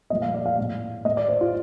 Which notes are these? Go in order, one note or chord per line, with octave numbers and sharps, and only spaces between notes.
A#2 F3 A3 D#5
F5
D5
F5
A2 A3
A2 A3 D#5
D5
C5
F4